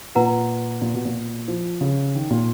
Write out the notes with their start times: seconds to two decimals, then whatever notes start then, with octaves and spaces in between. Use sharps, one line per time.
0.15 A#2 F4 B4 F#5 A#5
0.82 A#2
0.94 B2
1.05 A#2
1.48 F3
1.81 C#3
2.15 D#3
2.30 A#2